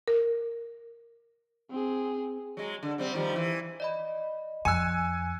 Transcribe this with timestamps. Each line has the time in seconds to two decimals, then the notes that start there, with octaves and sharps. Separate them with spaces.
0.08 A#4
1.70 C4 G#4
2.57 F#3 G#3
2.83 D3
2.98 C3 G3 C4
3.13 D#3 F3 G3
3.36 E3
3.80 D5 D#5 B5
4.65 F2 G#5 E6 F#6 C#7